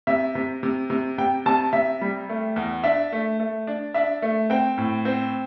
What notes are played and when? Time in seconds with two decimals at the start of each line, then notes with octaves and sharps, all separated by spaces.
0.07 C3 E5
0.35 C3
0.63 C3
0.90 C3
1.18 C3 G5
1.46 C3 A5
1.73 C3 E5
2.01 G3
2.29 A3
2.56 E2
2.84 D4 E5
3.12 A3
3.40 A3
3.67 D4
3.94 D4 E5
4.22 A3
4.50 C4 G5
4.78 A2
5.05 C4